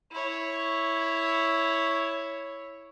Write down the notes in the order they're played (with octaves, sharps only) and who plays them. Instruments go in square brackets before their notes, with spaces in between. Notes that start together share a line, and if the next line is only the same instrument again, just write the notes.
[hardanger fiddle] E4 C#5